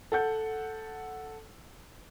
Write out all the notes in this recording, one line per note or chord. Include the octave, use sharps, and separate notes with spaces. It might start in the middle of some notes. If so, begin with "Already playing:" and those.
A4 F#5 G6